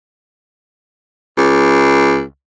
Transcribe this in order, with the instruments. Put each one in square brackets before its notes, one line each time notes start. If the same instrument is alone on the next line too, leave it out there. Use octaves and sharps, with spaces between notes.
[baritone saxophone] C#2